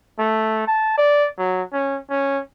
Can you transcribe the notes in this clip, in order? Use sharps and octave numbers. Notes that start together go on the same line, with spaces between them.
A3
A5
D5
F#3
C#4
C#4